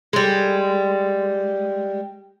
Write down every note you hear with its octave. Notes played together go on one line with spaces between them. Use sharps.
G3 G#3